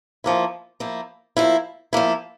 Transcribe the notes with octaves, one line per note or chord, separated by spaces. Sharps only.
F3 A#3 E4
F3 A#3 E4
F3 A#3 E4
F3 A#3 E4